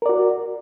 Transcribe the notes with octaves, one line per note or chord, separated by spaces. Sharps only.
F#4 A#4 D5